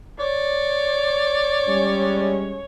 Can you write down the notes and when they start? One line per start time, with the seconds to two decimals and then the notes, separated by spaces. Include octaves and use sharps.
0.19 C#5 D5
1.68 G3 G#3 C#4